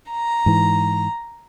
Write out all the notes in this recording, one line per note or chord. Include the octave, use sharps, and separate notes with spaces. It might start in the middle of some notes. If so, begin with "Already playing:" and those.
A#5
G#2 E3